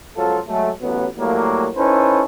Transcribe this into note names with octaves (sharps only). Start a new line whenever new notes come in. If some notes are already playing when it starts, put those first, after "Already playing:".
C#2 F3 F#3 F4 A4
F#3 G#3 A3
A1 F#3 B3
A2 F#3 G3 A#3
C#4 D#4 E4 A4 B4 C5